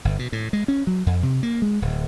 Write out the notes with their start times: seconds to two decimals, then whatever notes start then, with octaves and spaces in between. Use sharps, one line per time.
0.05 G1
0.19 B2
0.32 A2
0.53 G#3
0.68 C#4
0.87 F#3
1.06 F2
1.23 C3
1.43 A#3
1.62 G#3
1.82 D1